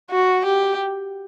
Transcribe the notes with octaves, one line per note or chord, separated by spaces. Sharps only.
F#4
G4